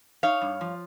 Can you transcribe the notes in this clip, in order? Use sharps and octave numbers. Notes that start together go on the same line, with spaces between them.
D#4 C#5 F5
G2
F3